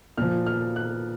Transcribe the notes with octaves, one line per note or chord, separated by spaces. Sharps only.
A#2 F3 F6
F6
F#6